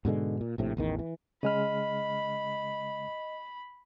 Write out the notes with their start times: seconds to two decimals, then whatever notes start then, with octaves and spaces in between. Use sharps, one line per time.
0.05 G#2 B2 D3 G#3
0.41 A#2
0.58 A#1 A2 C3
0.77 A1 E2 D#3
0.99 E3
1.43 C#3 G#3 D#5 B5 F6